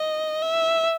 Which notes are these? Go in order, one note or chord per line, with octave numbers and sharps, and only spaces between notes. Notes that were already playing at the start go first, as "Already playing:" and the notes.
Already playing: D#5
E5